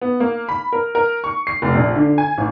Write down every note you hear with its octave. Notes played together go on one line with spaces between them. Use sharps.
B3
A#3
B5
A#4
A#4
C#6
C7
F1
A#1
D3
G#5
A1